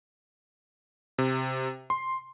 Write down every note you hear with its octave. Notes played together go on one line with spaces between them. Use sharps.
C3
C6